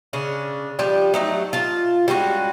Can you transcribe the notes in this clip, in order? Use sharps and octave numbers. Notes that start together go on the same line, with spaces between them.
C#3 C#4 D4
F3 G3 D4 G4
F#3 A3 D#4
F4 A5
G3 G#3 C#4 F#4